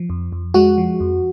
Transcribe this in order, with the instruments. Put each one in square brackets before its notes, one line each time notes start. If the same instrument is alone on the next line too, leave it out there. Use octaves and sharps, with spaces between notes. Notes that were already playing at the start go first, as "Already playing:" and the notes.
Already playing: [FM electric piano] F3
F2
F2
G#3 F#4
F3
F2